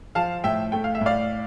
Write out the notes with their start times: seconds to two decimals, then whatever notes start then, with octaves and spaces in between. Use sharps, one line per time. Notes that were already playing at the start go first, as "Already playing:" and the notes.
0.15 F3 F5 A5
0.44 A2 E5 G5
0.72 A3 G5
0.84 F5
0.95 E5
1.01 A2
1.06 D5 F5